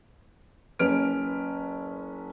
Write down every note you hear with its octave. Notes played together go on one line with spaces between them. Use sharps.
F#1 C#4 B4 F6 D7